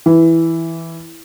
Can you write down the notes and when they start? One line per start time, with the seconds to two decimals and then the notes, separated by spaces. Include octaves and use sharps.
0.06 E3